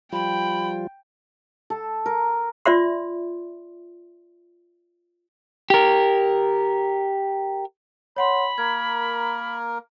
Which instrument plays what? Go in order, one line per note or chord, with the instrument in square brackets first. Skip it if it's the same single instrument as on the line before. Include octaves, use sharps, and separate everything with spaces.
[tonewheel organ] F3 G3 F4 [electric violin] G5 [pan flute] B5
[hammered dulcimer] A4
A#4
[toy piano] F4 D5 E5 C6
[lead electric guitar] G4 A#4
[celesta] C#5 F#5 C6 [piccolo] B5
[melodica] A#3 A#4 [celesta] G#6